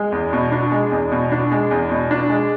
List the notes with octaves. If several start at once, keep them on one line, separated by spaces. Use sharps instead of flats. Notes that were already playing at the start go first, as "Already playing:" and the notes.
Already playing: G#3
E2
B2
D4
G#3
E2
B2
D4
G#3
E2
B2
D4
G#3